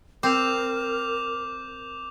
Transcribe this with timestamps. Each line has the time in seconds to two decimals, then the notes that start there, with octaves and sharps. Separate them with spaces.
0.23 C4 A#4 D6 G6 F7